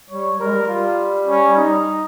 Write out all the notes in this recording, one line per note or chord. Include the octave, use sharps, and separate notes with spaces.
G3 C#5
G3 A#4
G#3
G3
G3 F4
C#4
D#4